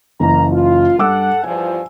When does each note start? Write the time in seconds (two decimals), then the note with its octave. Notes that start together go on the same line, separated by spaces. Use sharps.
0.20 F#1 E3 A#3 A#5
0.52 F4
0.99 G2 A4 F#5 D6 E6
1.44 E2 G2 F3 G#5